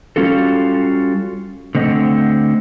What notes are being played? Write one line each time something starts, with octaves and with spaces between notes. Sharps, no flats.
G3 C#4 F4 F#4 A4
D3 A3 C4 D#5 F#5